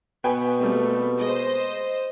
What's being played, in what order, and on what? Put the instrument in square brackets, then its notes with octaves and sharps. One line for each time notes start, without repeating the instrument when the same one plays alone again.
[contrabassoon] B2 [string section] B3 [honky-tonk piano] B4 G5 G#5
[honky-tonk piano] G3 C4 [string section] A3 A#3
[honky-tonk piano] G#3 [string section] C5 D#5